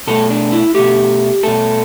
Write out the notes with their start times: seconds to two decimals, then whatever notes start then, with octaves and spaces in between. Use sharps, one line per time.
0.07 B2 A3 A4
0.30 D4
0.52 E4
0.75 B2 A3 G4
1.43 B2 A3 A4